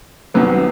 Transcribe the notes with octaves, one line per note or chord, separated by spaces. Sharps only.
C2 C3 D#3 F#3 B3